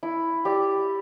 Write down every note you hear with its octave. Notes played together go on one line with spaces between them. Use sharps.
E4
G4 D5